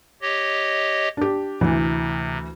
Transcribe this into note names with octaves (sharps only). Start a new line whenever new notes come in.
G4 C#5 D#5
D4 G4
D2 C3 E3